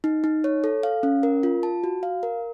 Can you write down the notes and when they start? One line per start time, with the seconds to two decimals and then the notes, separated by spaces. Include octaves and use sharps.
0.04 D#4
0.24 D#4
0.44 C#5
0.64 A4
0.83 F5
1.03 C#4
1.23 A#4
1.43 F4
1.63 A5
1.84 F#4
2.03 F5
2.23 A#4